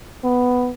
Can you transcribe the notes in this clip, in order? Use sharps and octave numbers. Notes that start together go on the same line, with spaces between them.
B3